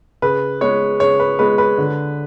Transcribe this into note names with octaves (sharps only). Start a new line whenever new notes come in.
C#3 B4
G#3 B3 C#5
C#3 C#5
B4
G#3 B3 B4
B4
D3